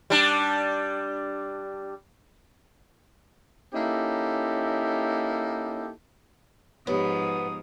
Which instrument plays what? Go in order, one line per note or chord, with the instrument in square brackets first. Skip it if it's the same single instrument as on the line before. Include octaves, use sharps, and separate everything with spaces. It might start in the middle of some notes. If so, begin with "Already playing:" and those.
[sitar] G3 D4
[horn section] A#3 C#4 D#4 E4 G4 A4
[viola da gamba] G#2 F3 [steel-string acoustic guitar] B3 [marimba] G4 C#5 [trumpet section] A#5 D#6